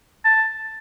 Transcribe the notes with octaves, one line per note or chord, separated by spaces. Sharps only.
A5